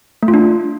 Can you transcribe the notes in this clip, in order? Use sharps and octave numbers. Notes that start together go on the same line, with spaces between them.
A3
F4
D4